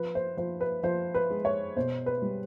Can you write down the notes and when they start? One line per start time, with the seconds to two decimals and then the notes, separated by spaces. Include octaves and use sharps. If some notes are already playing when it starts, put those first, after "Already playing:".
Already playing: F3 B4
0.15 C5
0.37 F3 C5
0.61 B4
0.83 F3 C5
1.14 B4
1.30 G#3
1.45 C#5
1.76 B2 C5
2.06 B4
2.22 G3